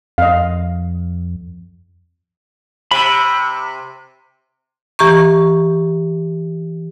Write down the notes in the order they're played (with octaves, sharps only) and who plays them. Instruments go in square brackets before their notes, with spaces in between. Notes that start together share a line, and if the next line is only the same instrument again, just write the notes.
[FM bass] F2 [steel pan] D#5 F5
[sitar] C3 [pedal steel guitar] B5 E6
[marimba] E3 G4 A#5 C#6